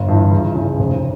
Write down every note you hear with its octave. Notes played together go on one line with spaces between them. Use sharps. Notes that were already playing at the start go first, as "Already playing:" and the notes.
Already playing: G1
G2 E3
C#2
C#3 E3
F1